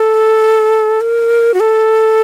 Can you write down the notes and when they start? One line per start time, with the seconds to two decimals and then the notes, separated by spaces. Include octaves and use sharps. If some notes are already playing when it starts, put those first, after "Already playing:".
Already playing: A4
1.01 A#4
1.54 F#4
1.60 A4